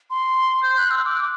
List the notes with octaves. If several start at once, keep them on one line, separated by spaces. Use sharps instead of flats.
C6
G6
F#6
E6
D6